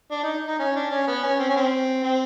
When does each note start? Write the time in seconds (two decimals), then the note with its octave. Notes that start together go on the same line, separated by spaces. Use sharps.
0.11 D4
0.24 D#4
0.48 D#4
0.60 C#4
0.76 D4
0.92 C#4
1.08 B3
1.23 C#4
1.39 C4
1.49 C#4
1.56 C4
2.03 C4